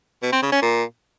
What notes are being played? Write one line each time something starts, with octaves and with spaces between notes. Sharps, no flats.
B2
C4
C#3
C#4
A#2